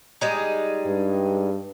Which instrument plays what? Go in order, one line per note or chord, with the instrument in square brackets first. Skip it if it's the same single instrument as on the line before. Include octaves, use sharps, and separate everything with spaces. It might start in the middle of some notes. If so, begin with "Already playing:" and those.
[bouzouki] G3 G#3 D#4
[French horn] G2